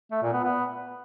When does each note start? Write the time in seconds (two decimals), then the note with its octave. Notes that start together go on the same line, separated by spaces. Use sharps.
0.12 A3
0.22 A#2
0.33 B3
0.44 B3